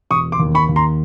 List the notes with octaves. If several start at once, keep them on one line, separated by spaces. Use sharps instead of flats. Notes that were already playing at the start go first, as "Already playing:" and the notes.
E1 C#6 D#6
C6 D6
D#2
B5 C#6
D#2
A#5 C6